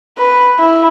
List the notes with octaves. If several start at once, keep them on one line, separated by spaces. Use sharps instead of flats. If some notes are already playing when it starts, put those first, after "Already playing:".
B4
E4